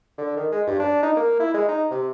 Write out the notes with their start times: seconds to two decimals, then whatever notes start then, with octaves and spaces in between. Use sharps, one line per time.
0.18 D3
0.37 D#3
0.52 G#3
0.67 G2
0.80 D4
1.03 D#4
1.17 A#3
1.40 E4
1.54 G#3
1.69 D#4
1.91 C3